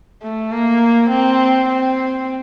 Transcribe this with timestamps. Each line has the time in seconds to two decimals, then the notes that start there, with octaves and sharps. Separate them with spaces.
0.23 A3
0.52 A#3
1.10 C4
1.69 C4